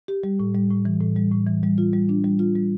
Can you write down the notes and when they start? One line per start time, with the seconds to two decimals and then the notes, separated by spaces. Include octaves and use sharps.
0.08 G4
0.24 G3
0.40 A2
0.55 G3
0.70 A2
0.85 E3
1.01 A2
1.16 G3
1.32 A2
1.47 E3
1.63 G3
1.78 F4
1.93 G3
2.09 D4
2.24 G3
2.39 F4
2.55 G3